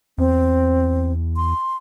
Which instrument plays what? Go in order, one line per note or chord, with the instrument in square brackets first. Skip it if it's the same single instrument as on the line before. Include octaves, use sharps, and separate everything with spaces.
[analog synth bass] E2 [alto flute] C4
[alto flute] C6